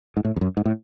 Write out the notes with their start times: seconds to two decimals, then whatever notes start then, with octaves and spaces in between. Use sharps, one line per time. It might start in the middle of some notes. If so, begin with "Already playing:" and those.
0.17 G#2
0.25 A2
0.36 E2
0.41 F#2
0.57 G#2
0.65 A2